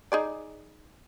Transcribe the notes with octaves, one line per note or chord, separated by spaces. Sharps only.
D#4 G#4 D5